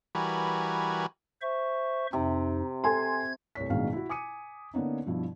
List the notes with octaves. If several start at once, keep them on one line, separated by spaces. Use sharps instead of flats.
E3 G3 F#4 A#4 B4 G#5
C5 E5 C#6
F2 C3 D#4
A4 G#5 C6 G#6
C2 A3 C#5 B6
A1 G2 B2 D#3 G#3 F5
E4 F#4
G#5 D6 D#6 C#7 D#7
D3 A#3 B3 C#4 D#4
G2 B2 F3 E4